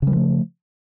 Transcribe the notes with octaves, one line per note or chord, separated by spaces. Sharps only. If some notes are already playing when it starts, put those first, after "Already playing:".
C#3 F3 G3 A3